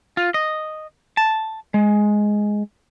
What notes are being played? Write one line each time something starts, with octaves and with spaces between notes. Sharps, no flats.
F4
D#5
A5
G#3